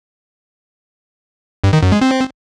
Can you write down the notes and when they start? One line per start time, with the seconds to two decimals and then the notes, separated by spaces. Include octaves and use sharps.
1.64 G2
1.73 D#3
1.82 F#2
1.92 G#3
2.01 C4